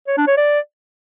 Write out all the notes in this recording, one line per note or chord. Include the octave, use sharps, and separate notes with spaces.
C#5
D4
C#5
D5